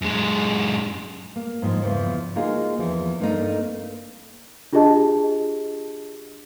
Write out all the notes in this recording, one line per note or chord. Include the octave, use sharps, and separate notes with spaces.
F#2 G#3
A#3
G#2 D#3 F3
E2 C#3 E3 F3
G#3 A#3 D#4 F4 F#4 G#4
E2 E3 F3
G2 A3 A#3 C4 D4 D#4
D4 F4 G4 G#4 D#5 A5